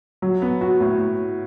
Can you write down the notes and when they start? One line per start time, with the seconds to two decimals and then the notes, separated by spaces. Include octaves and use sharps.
0.22 F#3
0.42 B3
0.61 F#4
0.80 A2